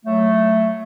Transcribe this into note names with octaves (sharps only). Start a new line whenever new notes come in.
F#3 A3